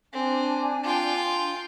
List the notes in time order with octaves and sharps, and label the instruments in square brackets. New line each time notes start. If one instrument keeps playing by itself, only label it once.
[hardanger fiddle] C4 [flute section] D4 G#5
[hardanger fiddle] F4 G5